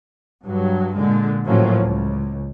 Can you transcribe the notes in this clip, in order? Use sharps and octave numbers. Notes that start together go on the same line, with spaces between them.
G2 F#3
A#2 D3 G#3
A2 F3 F#3 A#3 C#4
C#2